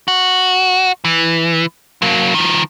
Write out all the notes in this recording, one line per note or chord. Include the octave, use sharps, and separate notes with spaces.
F#4
E3
F#3 A#3
D#3 F3